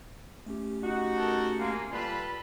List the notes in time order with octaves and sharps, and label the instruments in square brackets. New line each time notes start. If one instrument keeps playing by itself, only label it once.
[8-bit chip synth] A3 C#4 G4
[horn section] D#4 F#4
[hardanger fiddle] A4 A#4
[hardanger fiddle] G#3 [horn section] A#3
[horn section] G3 F4 B4 [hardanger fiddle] A4 B5